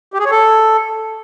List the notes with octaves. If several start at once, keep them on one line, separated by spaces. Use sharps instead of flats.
G4
G#4
C#5
A4